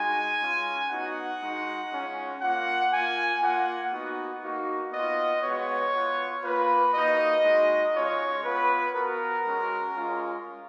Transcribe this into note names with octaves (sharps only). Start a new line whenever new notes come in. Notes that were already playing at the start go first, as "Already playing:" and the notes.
Already playing: G#3 D#4 F#4 G#5
G#3 C#4 F4
B3 D#4 F#4 F#5
G#3 D#4 F#4
G#3 C#4 F4
A#3 F4 F#5
A#3 F4 G#5
A#3 F4 F#5
B3 D#4 F#4
A#3 D#4 F#4
B3 F4 D#5
G#3 B3 F#4 C#5
B3 F4
A#3 F4 B4
A#3 D#4 F#4 D#5
G#3 D#4 F#4
G#3 C#4 F4 C#5
B3 F4 B4
B3 F#4 A#4
G#3 C#4 F#4
G#3 C#4 F4